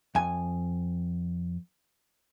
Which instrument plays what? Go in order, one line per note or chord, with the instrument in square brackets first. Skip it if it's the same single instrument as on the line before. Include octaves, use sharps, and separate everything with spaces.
[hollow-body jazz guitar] F2 G#5